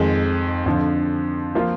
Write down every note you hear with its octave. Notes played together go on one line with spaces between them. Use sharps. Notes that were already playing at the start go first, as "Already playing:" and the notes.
Already playing: F2 D#3 G#3
F2 D3 F3
F3 A#3 F4